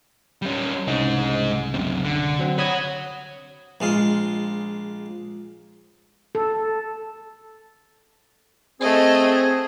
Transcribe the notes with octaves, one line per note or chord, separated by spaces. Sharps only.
G3 C#4
C2 C#3 G#3 D#4
F#2 C3
D3
F#3 C4
C#5 F#5 B5 D#6 G#6
A#1 G#3 F4
A4
A3 C4 G#4 D#5